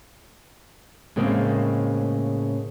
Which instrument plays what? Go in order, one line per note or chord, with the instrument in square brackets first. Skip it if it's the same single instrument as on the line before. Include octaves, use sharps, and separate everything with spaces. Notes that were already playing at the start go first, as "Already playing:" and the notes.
[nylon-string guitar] A2 C#3 G#3 A#3 C4